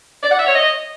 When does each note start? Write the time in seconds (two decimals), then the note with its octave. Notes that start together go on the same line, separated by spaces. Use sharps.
0.22 D5
0.30 F#5
0.38 E5
0.46 C#5
0.54 D#5